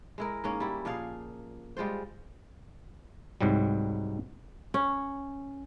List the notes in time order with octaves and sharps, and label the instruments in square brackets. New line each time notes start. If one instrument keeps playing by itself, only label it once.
[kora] G#3 E4 A#4
G#2 A#3 C#4
G3 E4
A#2 F3 G#4 F5
G3 G#3 F4 C5
[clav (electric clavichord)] C2 G#2 F#3 G3
[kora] C#4